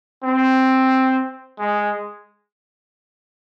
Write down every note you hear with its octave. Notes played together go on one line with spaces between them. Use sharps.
C4
G#3